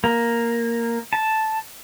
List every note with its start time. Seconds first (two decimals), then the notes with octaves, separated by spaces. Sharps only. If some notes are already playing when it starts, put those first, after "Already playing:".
0.04 A#3
1.13 A5